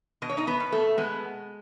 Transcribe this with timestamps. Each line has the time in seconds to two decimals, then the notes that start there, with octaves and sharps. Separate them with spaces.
0.22 B2 D#5
0.30 C#5
0.37 D#4 D#5
0.47 B3 B4
0.60 B2
0.72 A3 A4
0.98 B2 G#3 B3